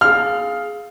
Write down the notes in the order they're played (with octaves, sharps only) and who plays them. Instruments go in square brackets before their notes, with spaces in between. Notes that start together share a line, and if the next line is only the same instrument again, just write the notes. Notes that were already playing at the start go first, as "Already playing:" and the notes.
[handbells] G#4 F5 [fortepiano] F6